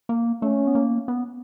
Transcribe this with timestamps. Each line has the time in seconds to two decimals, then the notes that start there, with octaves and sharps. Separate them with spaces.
0.09 A#3
0.42 A3 C#4
0.67 B3
0.75 A#3
1.08 B3